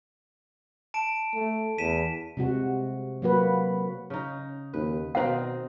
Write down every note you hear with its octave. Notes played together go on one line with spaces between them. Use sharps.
A5 D7
A3
E2 B6 D#7 E7
C3 G#3 F#4
F#3 A#3 F#4 B4
C#3 D#4
D#2 B4
B2 D#3 C4 D#4 C5 F#5